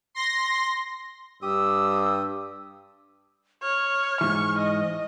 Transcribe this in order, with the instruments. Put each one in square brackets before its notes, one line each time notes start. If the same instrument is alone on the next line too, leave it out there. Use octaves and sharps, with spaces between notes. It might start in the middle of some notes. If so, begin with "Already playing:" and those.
[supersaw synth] C6 A#6
[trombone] G2 [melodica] G4 D#6 [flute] E6
[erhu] C#5 [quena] F6
[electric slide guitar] G#2 E3 [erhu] C#6
[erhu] D#5